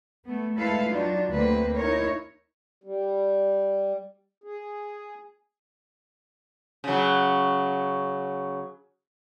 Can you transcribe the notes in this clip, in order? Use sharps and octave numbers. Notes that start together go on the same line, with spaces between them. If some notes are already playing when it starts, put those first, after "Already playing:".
A3 B3
G#3 A3 E4 A4 B4 F5
F#3 D4 D#4 F4
D2 A#3 C4 B4
D#4 E4 A#4 C#5
G3
G#4
C#3 F#3